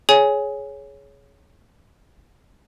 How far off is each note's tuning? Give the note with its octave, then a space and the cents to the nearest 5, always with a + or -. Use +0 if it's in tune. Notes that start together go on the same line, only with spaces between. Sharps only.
G#4 +15 C#5 +5 G#5 +0